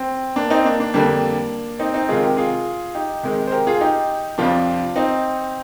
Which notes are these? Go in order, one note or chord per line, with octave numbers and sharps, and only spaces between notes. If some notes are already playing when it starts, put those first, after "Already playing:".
Already playing: C4
A#3 D4
C4 D#4
A#3 D4
A#3 D4
F2 D3 G3 A#3 D4
C4 D#4
C4 D#4
C3 D#3 G#3 F4 G#4
G4 A#4
F4 G#4
D#4 G4
C3 D#3 G#3
C5
G4 A#4
F4 G#4
D#4 G4
F2 C3 F3 D4 F4
C4 D#4